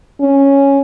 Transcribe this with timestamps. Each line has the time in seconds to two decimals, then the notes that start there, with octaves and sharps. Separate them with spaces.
0.20 C#4